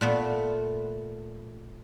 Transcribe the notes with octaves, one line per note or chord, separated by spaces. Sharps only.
A#2 A3 B3